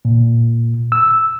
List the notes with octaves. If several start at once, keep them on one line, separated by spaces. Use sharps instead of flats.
A#2
E6